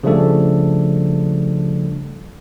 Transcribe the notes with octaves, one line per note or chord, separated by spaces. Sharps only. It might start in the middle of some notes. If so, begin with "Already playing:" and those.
C#3 F3 G3 A3 D4 A4